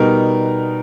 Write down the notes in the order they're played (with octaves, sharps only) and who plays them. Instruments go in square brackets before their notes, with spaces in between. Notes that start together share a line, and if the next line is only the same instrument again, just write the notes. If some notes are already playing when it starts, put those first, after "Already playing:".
Already playing: [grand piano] B2 G3 B3 D#4 A#4